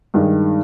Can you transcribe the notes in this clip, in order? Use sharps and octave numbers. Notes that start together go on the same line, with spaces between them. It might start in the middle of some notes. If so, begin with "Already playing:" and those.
G2 D#3 G#3